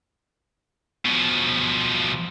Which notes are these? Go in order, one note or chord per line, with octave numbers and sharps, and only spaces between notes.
B2 F3